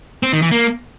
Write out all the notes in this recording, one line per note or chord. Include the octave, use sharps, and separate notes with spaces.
C4
D#3
E3
A#3